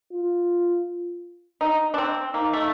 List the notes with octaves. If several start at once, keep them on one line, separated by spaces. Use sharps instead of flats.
F4
D#4
D4
C4
A#3 D#4
A3